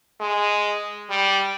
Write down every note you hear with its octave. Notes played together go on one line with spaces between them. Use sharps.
G#3
G3